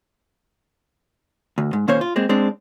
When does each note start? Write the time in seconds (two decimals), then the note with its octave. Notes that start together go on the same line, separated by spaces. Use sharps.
1.58 D2
1.73 G#2
1.88 D#2 A#2 A#3 C#4 C5 C#5
2.01 F4
2.16 G#3 A#3 C4
2.29 G#3 C4 D4